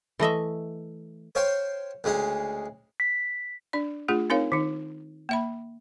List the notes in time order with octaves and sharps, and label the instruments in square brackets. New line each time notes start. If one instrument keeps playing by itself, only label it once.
[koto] E3 A3 D#5 E5
[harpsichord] C5 C#5 F5 G5 C6
D2 C#3 G#3 F5
[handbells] B6
[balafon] D4 D5
A3 D4 F4 G#4
C4 D#4 A#4 C#5 F5
D#3 D#4
A#3 E5 B5